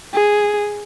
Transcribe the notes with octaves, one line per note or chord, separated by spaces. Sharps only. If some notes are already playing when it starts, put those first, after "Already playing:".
G#4